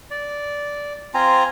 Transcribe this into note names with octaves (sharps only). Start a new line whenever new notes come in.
D5
C4 F4 G#5 A#5